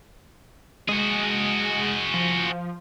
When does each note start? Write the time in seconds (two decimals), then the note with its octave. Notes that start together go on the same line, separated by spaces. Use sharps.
0.89 G#3 F#4 G#4
2.14 F3